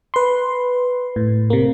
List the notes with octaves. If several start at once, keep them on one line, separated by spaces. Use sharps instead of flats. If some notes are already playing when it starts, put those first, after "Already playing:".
B4 C6
A2
C3 A#3